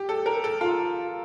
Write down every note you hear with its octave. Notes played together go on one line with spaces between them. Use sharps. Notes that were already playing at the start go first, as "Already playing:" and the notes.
Already playing: G4
A4
A#4
A4
F4